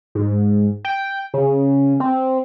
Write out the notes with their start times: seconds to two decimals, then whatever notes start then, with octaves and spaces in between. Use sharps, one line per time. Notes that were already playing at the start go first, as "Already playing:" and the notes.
0.15 G#2
0.85 G5
1.34 C#3
2.00 C4